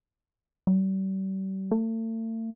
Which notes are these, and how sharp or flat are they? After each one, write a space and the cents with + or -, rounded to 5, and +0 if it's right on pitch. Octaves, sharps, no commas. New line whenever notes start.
G3 -40
A3 +40